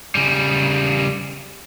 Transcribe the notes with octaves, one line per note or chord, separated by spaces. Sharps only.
C#3 G3